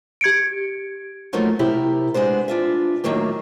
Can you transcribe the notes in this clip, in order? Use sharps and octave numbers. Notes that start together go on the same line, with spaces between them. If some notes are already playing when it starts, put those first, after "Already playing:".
G4 G#6 C#7 D7
F3 F#3 A3 A#3 D#4 F4
C3 E4 G4 A#4
G#3 B3 D4 C5
D4 F4 E5
A2 D#3 E3 F#3 A#3 G4